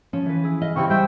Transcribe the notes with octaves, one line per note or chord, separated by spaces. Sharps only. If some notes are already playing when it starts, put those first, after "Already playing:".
F3 C#4
E3 B4
E4 G#4
D#5 F5
C#3 C4 E4 G4 C#6
G3 C5 E5 G5